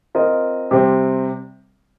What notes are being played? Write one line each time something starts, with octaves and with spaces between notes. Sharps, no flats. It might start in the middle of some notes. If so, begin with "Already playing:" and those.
C4 F4 A#4 D#5
C3 G3 C4